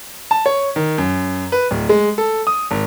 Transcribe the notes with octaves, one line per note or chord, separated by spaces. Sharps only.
A5
C#5
D#3
F#2
B4
D1
G#3
A4
D#6
G#1